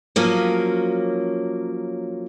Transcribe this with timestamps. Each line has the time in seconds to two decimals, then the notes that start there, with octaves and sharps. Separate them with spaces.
0.16 F3 F#3 A#3 C#4